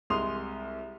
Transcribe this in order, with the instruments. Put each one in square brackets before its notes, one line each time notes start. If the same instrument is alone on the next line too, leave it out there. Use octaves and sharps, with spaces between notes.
[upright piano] C2 G#3 C6 D#6 F7